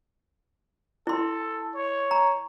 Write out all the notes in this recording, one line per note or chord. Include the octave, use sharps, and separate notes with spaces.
E4 A4 C6
C#5
A#5